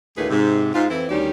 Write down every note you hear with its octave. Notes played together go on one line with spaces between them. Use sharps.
D2 A2 D#3 A#3 G#4 B4
G#2 C3
G#2 F4
F2 E3 F3 C4 E4
D2 D#3 G3 C#4 G4 D5